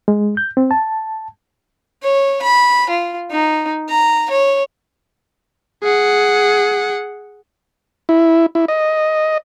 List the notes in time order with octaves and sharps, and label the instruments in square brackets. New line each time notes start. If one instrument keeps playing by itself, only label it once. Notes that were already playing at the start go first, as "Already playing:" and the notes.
[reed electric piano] G#3
G6
C4
A5
[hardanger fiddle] C#5
B5
F4
D#4
A#5
C#5
[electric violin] G#4 F#5
[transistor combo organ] E4
E4
D#5